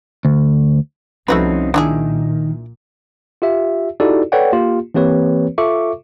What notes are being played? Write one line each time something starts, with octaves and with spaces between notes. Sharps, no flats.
D2
C2 F3 A3 C4 C#4 D#4 F#4 B4
A#2 D#3 D4 E4 G#4
F4 G4 E5
D#4 E4 F#4 G4 A4 D5
A4 B4 C#5 D5 F#5 G5
A#3 F4 G4
E3 A#3 C4 G4 B4 C#5
F4 A4 E5 C#6 D6